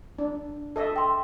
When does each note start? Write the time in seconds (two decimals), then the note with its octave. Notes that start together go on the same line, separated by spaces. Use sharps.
0.19 D4
0.76 A4 D#5 E5
0.96 G5 C6